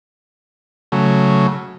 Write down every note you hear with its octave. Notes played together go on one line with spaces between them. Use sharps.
C#3 F#3 A3